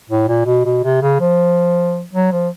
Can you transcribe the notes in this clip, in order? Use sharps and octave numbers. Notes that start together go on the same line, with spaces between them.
A2
A#2
B2
B2
C3
C#3
F3
F#3
F3